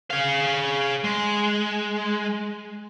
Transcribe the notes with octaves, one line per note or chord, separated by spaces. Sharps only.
G#4 F5
G#3